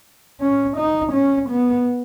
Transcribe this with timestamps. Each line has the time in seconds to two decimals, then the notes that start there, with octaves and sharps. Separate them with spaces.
0.41 C#4
0.77 D#4
1.13 C#4
1.50 B3